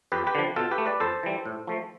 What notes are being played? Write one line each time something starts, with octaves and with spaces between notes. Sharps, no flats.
F2 G4 B4
G4 B4
D3 F3
B2 F4 A4
G4 B4
A3
B4 D5
F2 A4 C5
E3 G3
A2
F3 A3